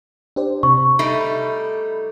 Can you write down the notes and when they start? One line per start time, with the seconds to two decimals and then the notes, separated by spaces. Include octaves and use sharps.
0.36 D4 G4 C5
0.63 C3 C#6
0.99 G3 A3 D#4 B5